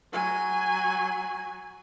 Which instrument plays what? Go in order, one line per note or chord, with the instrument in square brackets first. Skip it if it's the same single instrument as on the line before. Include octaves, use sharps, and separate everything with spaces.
[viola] F#3 G#5